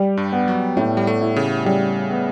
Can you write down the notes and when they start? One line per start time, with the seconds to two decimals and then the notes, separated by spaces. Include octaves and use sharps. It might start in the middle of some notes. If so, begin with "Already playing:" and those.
Already playing: G3
0.17 G2
0.32 B3
0.48 F#3
0.77 A2 A3
0.97 G3
1.07 A3
1.22 E4
1.36 C#3
1.65 C#3 G3
2.10 B3